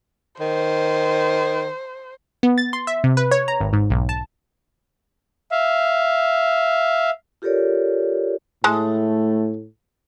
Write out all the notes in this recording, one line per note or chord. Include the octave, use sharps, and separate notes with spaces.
D#3 C5
B3
A6
C6
E5
C3
B4
C#5
A#5
G#1
G#2
B1
A5
E5 F5
F4 G4 A4 A#4 C#5 D5
A2 G#3 A3 A4